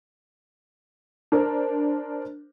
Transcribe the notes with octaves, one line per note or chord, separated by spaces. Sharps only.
D4 A#4 C5